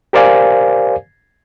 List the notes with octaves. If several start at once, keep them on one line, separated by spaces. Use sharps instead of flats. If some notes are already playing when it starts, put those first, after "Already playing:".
G4 A#4 C5 D5 F5 G#5